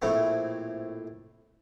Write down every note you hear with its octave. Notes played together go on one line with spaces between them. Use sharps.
A#1 A2 A3 C4 C#5